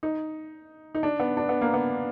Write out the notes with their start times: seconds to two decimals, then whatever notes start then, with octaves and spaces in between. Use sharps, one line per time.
0.03 D#4
0.95 D#4
1.03 D4
1.20 B3
1.37 D4
1.49 B3
1.61 A#3
1.74 B3